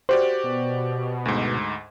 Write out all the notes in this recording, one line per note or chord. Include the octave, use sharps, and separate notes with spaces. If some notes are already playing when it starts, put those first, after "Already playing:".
F#4 G4 C5 D5
B2
D2 G#2